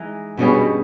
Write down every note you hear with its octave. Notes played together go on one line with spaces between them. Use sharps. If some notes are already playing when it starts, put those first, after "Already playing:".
Already playing: E3 G#3 D#4
G2 B2 G3 C#4 G#4